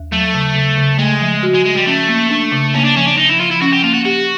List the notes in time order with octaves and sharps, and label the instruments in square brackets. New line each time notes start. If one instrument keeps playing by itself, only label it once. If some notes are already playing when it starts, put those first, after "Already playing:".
Already playing: [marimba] D#2
[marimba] F#3 [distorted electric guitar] A3
[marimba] C#3
C#3
C#3
[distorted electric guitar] G#3 [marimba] A3
[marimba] F3
F#4
[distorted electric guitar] G#3
[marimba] F3 [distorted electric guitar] G#3
[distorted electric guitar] G3
[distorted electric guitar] A3 [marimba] C#4
[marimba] A#3
D4
C#3
[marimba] A#3 [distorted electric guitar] C#4
[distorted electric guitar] D4
[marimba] F3 [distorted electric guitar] C#4
[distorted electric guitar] D4
[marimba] F3 [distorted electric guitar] D#4
[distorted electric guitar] E4
[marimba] F3 [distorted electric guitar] F4
[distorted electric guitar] E4
[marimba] C#4 [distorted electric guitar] F#4
[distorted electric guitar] G4
[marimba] A#3 [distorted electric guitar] F4
[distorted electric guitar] F#4
[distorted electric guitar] F#4 [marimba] G4